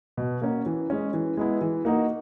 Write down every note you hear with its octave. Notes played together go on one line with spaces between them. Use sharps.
B2
A#3 C#4 F#4
E3
G#3 C#4
E3
G#3 B3 E4
E3
A#3 D#4 F#4